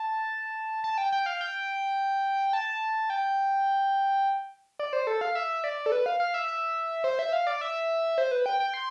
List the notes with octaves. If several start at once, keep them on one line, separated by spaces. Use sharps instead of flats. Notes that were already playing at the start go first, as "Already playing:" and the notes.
Already playing: A5
A5
G5
G5
F5
G5
A5
G5
D5
C5
A4
F5
E5
D5
A4
B4
F5
F5
E5
E5
C5
E5
F5
D5
E5
C5
B4
G5
G5
C6